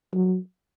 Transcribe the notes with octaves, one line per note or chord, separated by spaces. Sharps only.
F#3